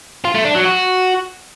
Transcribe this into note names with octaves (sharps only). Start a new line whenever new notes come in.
F4
A3
D4
F#3
F#4